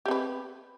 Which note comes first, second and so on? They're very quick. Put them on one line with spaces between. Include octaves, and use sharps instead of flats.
G4 C4 B4